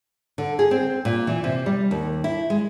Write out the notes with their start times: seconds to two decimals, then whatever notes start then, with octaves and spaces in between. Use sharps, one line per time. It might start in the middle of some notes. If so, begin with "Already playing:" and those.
0.38 D3
0.59 G#4
0.71 C4
1.05 A#2
1.27 E3
1.44 C3
1.66 G3
1.91 D#2
2.24 E4
2.50 G#3